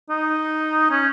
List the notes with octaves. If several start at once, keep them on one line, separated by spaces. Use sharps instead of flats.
D#4
C#4